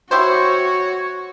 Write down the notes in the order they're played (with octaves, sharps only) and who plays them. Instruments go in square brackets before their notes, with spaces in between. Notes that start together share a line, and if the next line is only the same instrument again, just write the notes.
[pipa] E4 G4 C5 [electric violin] F#4 [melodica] C#5